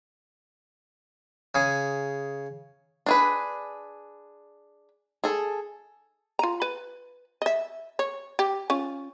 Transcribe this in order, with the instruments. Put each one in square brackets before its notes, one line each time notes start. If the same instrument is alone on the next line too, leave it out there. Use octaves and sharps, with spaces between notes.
[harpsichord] C#3 G#4
[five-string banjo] D4 G#4 B4
G#4 A4
[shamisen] F4 A#5
B4
D#5 E5
C#5
G4
C#4 F4